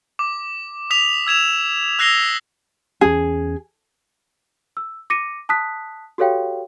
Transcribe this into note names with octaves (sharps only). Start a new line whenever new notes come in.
D6
D#6 B6 F7
E6 G#6 E7 F7
E6 F#6 A#6 C7 F7 G7
E2 C#4 G#4
E6
D6 A#6 C#7 D#7
A5 D#6 F#6 B6
F#4 G4 A4 C#5 F5 G5